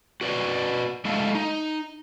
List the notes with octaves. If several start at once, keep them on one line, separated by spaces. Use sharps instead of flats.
F#4 B4 D5
G#3 A3 E4 A4 F5
D#4